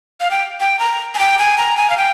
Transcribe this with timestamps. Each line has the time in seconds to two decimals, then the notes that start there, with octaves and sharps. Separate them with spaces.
0.20 F5
0.31 G5
0.60 G5
0.79 A#5
1.15 G#5
1.19 G5
1.39 G#5
1.58 A#5
1.77 G#5
1.90 F5
1.97 G5